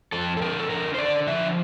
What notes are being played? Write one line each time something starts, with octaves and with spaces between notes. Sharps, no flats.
F2 A4
A4
D3 A#4
A4
D3 A#4
C5
D3 D5
F3 E5